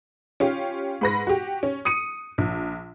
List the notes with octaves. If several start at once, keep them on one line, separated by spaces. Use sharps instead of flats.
C#4 F4 G4
G#2 B4 A#6
F#4 G4
C#4
D#6 C#7 D#7
A#1